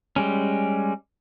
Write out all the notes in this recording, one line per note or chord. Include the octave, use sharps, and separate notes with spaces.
G3 G#3 C#4